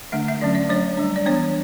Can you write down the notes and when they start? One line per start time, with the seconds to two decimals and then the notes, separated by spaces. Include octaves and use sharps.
0.12 D3 A3 D4 E5
0.28 E5
0.41 D3 F#3 C#4 D5
0.55 D5
0.69 F#3 A3 D4 C#5
0.97 G3 D4
1.16 D5
1.26 E3 B3 D4 C#5